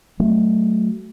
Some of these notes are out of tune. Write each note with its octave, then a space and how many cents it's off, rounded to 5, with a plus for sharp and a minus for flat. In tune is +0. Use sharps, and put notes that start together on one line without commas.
F#3 +20 A3 +0